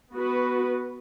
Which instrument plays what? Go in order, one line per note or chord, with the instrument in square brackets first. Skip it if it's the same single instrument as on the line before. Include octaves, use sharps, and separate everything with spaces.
[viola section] B3 F#4 B4